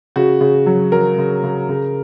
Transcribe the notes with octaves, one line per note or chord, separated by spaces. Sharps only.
C#3 F#4
C#3
F#3
F#3 A#4
C#3
C#3
C#3